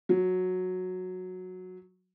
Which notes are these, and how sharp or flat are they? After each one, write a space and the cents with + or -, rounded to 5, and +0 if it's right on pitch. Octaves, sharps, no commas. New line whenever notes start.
F#3 -10